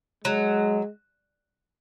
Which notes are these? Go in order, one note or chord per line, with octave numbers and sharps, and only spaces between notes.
F#3 G#3